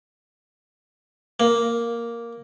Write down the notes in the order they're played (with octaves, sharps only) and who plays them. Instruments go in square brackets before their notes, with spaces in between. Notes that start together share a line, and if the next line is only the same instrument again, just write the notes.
[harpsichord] A#3